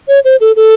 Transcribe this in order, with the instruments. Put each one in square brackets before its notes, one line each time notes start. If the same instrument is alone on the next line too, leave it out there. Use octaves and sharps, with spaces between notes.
[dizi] C#5
C5
A4
A4